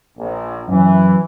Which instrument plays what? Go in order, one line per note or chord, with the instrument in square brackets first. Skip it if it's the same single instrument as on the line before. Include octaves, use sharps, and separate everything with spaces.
[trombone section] A#1
[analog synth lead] F#2 [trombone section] E3